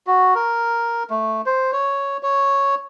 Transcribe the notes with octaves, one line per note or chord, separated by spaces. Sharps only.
F#4
A#4
A3
C5
C#5
C#5